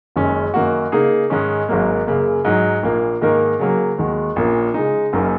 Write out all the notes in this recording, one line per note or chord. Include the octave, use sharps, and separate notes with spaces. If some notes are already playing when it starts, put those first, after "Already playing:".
F#1 F#2 D#3 G#3 C#4
F#2 D#3 A#3 F#4
C#3 A#3 D#4 G#4
G#2 D#3 G#3 C#4
G#1 G#2 F#3 A#3
F#2 C#3 A#3
G#2 F#3 D#4
A#1 A#2 A#3
G#2 D#3 A#3 D#4 A#4
C#3 F#3 A#3
D#2 D#3 G#3 F#4
A#1 A#2 A#3 C#4 A#4
C#3 G#3 D#4
F#1 F#2 F#3 A#3 D#4